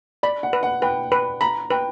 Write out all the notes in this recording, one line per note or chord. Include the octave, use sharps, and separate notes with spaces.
D5 B5
F#5
B4
F#5
B4 G5
B4
A#5 B5
B4 G5